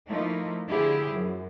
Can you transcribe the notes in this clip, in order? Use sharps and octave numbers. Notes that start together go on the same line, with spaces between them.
F3 A3 A#3 D#4 E4
D3 F3 E4 G4 G#4
F#2